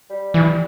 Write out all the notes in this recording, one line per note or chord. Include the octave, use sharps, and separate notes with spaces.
G3
E3